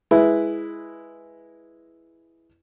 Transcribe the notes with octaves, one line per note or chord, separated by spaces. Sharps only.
G#3 E4 B4